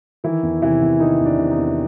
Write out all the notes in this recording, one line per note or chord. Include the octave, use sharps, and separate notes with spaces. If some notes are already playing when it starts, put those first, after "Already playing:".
D#3 E3 E4
E2
C3 E3 E4
E2
D#3 D#4
E2
D4
C3
D#4
E2